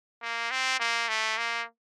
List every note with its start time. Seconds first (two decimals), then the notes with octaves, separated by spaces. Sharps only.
0.22 A#3
0.51 C4
0.80 A#3
1.09 A3
1.38 A#3